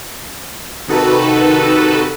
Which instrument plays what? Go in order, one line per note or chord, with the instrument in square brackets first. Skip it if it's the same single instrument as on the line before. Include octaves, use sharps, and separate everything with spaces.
[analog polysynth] C3 D#3 D#4 F#4 A4 B4